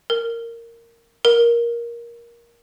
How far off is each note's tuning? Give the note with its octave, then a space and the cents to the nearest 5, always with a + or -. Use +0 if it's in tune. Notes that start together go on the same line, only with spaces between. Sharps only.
A#4 -10
A#4 +15